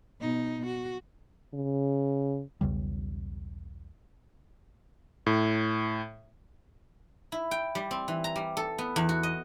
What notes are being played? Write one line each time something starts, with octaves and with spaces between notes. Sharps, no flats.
B2 D#4
F#4
C#3
B1 E2 C#3 G3
A2
E4
G5
G3
C4
E3
A#5
G3
A4
B3
E2
F#4
D#5